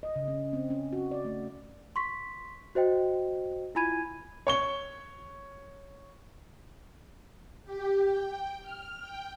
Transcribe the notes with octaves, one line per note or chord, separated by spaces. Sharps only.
D#5
C#3
C#4
C4
C#4
F#4
D5
A3
C6 C#6 B6
F#4 C5 D#5 G5
E4 F4 G#5 B5 G#6 D#7
C#5 C#6 G7
G4
G5
F6
G5